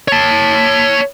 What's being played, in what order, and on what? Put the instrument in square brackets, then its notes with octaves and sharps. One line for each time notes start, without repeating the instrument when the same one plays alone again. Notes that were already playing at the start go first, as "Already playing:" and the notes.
[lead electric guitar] C#5 A5